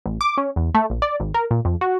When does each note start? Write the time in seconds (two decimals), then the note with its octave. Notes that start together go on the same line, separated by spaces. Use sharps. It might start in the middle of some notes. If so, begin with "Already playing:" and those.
0.06 A1
0.21 D6
0.38 C#4
0.56 E2
0.74 A3
0.90 A#1
1.02 D5
1.20 G#1
1.34 A#4
1.51 A#2
1.65 F2
1.81 F#4